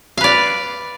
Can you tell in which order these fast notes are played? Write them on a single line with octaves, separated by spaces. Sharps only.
F5 B4 D5